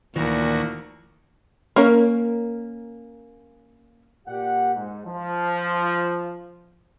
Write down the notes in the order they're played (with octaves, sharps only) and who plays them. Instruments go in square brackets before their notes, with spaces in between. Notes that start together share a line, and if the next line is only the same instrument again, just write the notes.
[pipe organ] D2 F#4 A#6 [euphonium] A#2 [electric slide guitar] D#3 E3
[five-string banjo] A#3 C#4 A#4
[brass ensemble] A#2 G4 F#5
G#2
F3